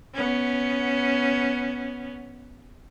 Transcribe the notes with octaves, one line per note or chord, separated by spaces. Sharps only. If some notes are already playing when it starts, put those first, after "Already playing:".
B3 C#4